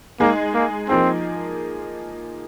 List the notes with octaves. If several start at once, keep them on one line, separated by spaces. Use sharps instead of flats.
G#3 A#3 D#4 G#4
A#3
F3 A#3 C4 D#4 G#4